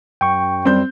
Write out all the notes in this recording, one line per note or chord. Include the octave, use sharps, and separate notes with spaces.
F#2 G5 C#6
G3 C4 G6